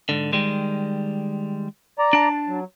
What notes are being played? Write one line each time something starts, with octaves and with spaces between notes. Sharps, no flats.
G#2 D3
D#3 G3 G#3
D5 A#5
D4 A5
F#3